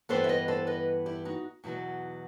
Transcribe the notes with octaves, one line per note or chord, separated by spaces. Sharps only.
G2 E3 G3 B3 A4 C5
E5
B4 D#5
A4 C5
B4 D#5
E4 G4
D#4 F#4
E2 B2 F#3 B3 E4